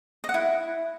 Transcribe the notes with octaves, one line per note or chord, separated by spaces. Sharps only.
D#5
F#5
E4